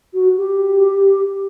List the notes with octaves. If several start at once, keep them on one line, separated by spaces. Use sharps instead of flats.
F#4
G4